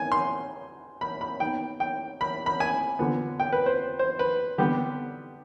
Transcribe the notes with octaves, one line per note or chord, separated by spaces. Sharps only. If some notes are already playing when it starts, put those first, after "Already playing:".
Already playing: D#3 B3 G#5
C6
B5
B5
D#3 B3 G5
G5
B5
B5
G#5
D3 F3 B3
G5
B4
C5
C5
B4
D3 G3 B3 G4